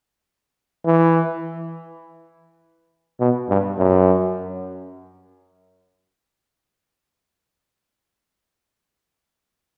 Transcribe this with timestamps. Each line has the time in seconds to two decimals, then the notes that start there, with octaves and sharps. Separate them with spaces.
0.86 E3
3.20 B2
3.49 G2
3.78 F#2